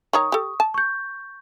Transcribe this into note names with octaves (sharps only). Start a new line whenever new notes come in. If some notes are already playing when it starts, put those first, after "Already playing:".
D#3 C#5 A#5 C#6 D#6
G4 A4
A5
C#6 G6